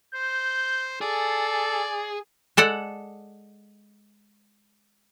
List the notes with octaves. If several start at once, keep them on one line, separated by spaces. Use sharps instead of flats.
C5 G6
G#4 A4 D5
G#3 A4 D5 F#5